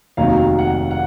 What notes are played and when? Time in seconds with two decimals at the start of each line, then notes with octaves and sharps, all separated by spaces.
0.17 F1 D#2 D#3 F#3 F5
0.59 F#5
0.91 F#5